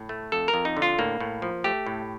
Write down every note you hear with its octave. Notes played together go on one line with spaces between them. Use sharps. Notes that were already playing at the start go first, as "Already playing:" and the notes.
Already playing: A2
A3
F2 A4
A#4
F2
D#4
D3
F4
A2 A#3
A2
F3
A3 G4
A2